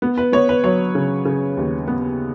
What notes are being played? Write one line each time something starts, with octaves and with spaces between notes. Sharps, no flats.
B3
B4
B3 C#5
B4
F#3 C#5
C#3
C#3
D#2
B3